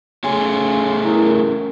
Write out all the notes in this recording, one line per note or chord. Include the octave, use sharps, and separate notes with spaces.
A3 C#4 G#4 G#5 C6
E4 A#4